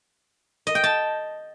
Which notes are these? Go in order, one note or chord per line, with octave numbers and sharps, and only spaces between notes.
D#5
G5
A5